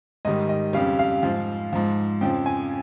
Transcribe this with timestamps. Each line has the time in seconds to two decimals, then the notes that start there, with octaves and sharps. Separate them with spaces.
0.25 G#2 D#3 G3 D#5
0.49 D#5
0.73 F2 C#3 G3 F5
0.99 F5
1.23 G#2 F3
1.73 G#2 F3
2.21 F2 C#3 F3 G5
2.46 G#5